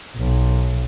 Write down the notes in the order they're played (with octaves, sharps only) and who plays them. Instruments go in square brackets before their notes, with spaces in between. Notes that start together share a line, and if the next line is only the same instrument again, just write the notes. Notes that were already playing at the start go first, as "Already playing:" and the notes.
[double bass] B1